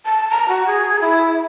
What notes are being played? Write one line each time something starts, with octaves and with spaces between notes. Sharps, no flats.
A5
A#5
F#4
G#4
E4